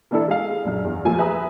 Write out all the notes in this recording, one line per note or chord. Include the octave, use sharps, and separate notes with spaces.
E3 A#3 D4 E4 A4
G#3 G#4 F5
A#1 F#2 F6
E2
F3 A3 A#3 G#5 E6
G#4 B4 E5 G#5 A#5 D#6